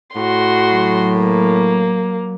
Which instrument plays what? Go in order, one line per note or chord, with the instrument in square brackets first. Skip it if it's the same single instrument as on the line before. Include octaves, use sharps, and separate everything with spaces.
[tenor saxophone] A2 [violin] F#4 C6
[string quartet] F#3
[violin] A#3